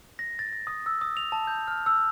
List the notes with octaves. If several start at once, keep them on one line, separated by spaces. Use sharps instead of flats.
A#6
A6
A#6
D#6
E6
D#6
F7
A5
G6
F6
E6